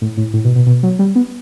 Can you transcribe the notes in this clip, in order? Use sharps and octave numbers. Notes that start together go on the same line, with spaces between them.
A2
A2
A2
B2
B2
B2
F#3
G3
B3